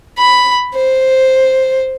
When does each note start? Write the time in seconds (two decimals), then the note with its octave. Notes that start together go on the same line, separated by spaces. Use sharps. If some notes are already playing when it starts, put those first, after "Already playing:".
0.18 B5
0.74 C5